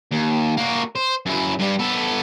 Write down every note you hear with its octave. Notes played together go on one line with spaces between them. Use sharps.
D#2
A#3 F#4
C5
F#2 E4
G2 G3
B3 A4